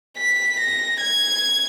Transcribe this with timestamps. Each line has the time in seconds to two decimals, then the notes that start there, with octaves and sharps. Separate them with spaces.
0.18 B6
0.60 A#6
1.01 G#6